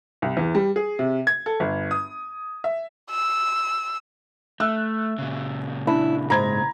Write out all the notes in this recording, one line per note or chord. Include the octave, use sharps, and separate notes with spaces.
C2
E2
G3
G#4
C3
G#6
A4
G1
D#6
E5
E6
A3 E5 E6 F#6
A#2 C#3
D4 E4
G#2 A#5 B5 G#6